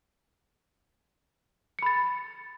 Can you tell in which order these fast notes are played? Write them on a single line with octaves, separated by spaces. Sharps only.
C#7 B5 A6